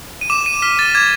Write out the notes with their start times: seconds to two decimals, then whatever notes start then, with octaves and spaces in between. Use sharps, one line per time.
0.21 D#7
0.30 D6 E7
0.46 D#7
0.62 F6 B6
0.79 A6
0.95 D6 G#6